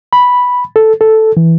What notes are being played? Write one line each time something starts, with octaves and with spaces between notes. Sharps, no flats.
B5
A4
A4
E3